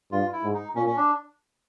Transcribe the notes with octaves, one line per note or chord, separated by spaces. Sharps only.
G2 F4
E4
G#2
D#4
A#2 C#4
C#4
D4